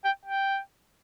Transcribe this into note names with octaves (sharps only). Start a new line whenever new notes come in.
G5
G5